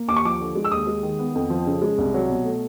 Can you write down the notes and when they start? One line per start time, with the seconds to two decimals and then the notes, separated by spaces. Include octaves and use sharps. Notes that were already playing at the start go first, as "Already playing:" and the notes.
Already playing: A#3
0.08 D#2 D6
0.17 C#6
0.25 F3 D6
0.41 D3
0.55 G#3
0.65 E6
0.71 D#2 D#6
0.87 G#3
1.03 D#3
1.19 B3
1.35 F2
1.50 F3
1.67 C#3
1.82 G#3
1.98 C2
2.14 F#3
2.29 B2
2.44 A3